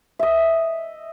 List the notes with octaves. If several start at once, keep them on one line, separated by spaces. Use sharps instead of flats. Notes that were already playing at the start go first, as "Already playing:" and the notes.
D#5 E5